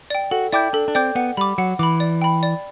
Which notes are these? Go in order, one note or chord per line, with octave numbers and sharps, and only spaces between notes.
D5 G5
F#4 A4
E4 D5 G5 D6 G6
D4 A4
D4
C4 D5 G5 D6 G6
B3 F#5
G3 B5 D6
F#3 F#5
E3 B5 D6
D5
G5 B5
D5